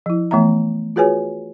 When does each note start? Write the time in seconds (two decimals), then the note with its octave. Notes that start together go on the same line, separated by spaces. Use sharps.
0.06 F3 E4
0.31 E3 A3 B3 E5 A#5
0.96 F4 F#4 G#4 B4 C#5 G#5